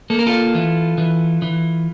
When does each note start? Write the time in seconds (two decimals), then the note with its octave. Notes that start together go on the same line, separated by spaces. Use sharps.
0.10 A#3 A4
0.19 A#4
0.27 F4 A4
0.55 E3
0.98 E3
1.42 E3